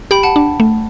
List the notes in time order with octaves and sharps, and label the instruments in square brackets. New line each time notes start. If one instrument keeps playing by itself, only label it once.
[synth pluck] G4 [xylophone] G5 B5
[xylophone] F#5 A5
[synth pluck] D4
A3